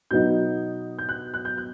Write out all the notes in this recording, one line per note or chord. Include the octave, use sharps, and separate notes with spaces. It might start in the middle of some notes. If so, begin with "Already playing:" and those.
B2 F#3 B3 D#4 G6
G6
F#6
F#6
G6
F#6